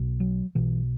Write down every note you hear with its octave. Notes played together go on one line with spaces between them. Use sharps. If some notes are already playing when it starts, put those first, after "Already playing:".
Already playing: B1 B2
F#3
B1 B2 E3